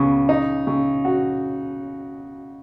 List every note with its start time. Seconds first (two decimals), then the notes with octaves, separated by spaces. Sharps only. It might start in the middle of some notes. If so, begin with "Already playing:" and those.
Already playing: C#2 C#3 B3
0.29 D#4
0.67 C#3
1.05 F#4